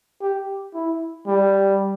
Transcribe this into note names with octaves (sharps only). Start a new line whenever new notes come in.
G4
E4
G3